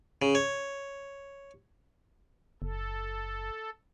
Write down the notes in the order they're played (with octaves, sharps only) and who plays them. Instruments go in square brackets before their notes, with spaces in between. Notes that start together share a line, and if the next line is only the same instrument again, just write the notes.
[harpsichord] C#3
C#5
[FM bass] F#1 [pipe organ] A4